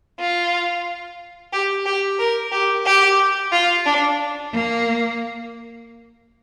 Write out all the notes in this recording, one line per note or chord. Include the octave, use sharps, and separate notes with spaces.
F4
G4
G4
A#4
G4
G4
F4
D4
A#3